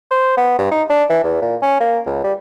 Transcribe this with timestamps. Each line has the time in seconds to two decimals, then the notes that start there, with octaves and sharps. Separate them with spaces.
0.11 C5
0.37 B3
0.59 G2
0.71 D#4
0.90 D4
1.10 E3
1.24 E2
1.42 A#2
1.62 C#4
1.81 A#3
2.06 C#2
2.24 G3